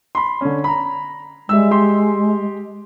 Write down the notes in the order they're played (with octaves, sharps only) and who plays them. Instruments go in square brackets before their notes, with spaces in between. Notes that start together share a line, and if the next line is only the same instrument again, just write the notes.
[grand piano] B5 C6
D3 C#4
A#5 B5
[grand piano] G3 E5 E6 [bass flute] G#3
[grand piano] G4 D#5 C6